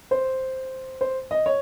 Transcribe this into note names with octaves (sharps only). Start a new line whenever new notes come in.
C5
C5
D#5
C#5